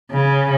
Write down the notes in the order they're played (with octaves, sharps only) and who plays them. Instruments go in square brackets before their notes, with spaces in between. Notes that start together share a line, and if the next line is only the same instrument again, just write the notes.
[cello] C#3